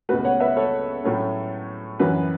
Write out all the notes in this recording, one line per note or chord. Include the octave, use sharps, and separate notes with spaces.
C#2 B2 A3 F#4 B4
C#5 F#5
B4 E5
A4 C#5
A2 F#3 A3 C#4
F#2 E3 C#4 F#4 B4